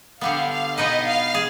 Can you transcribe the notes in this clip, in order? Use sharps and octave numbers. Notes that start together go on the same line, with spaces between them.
D3 G3 B3 F5
F5
B2 B3 D#4 B4 D#5
F5
G#4